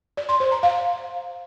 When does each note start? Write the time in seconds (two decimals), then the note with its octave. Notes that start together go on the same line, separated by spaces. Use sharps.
0.17 D5
0.29 C6
0.40 C5
0.52 A#5
0.63 F5